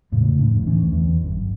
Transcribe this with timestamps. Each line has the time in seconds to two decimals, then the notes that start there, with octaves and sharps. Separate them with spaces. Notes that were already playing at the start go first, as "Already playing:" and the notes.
0.12 E2 A2 C#3 G#3
0.39 D1 F2 A2 D4
0.66 D2 E3 C#4
0.93 E2
1.22 G1 F#2